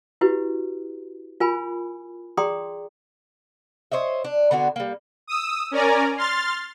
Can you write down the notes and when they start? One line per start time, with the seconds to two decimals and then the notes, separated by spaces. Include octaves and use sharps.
0.21 E4 F#4 G4 B4
1.40 F4 A#4 G#5 B5
2.37 G#4 D5 G5 A#5 C6 D#6
3.92 C5 C#5 D#5 E5
4.24 D4
4.51 D3 B3 D4 F#4
4.76 G3 A#3
5.27 D#6 E6
5.71 C#4 A#4 D5 G#5 A#5
6.17 C6 F6 A6